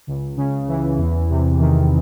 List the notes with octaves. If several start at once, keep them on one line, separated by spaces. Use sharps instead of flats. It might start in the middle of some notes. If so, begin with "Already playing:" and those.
C#2
C#3
E3
E2
C3
D#3